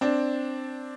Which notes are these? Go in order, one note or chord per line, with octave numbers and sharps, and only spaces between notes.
C4 D4